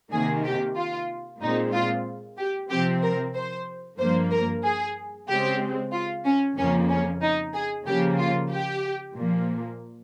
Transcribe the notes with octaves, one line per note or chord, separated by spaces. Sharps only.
C3 D#3 A#3 G#4
G4
F4
A#2 G#3 C4 D#4
F4
G4
C3 F3 C4 G4
A#4
C5
G2 F3 A#3 C5
A#4
G#4
C#3 G#3 C4 G4
F4
C#4
F2 C#3 F3 A#3 C#4
C#4
D#4
G#4
C#3 F3 A#3 G4
F4
G4
A#2 F3 A#3